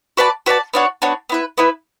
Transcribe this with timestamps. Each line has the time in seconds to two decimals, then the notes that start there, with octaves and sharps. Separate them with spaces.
0.17 F#4 B4 D5 A5
0.46 F#4 B4 D5 A5
0.73 B3 D4 F#4 C#5
1.02 B3 D4 F#4 C#5
1.29 B3 E4 B4
1.58 B3 E4 B4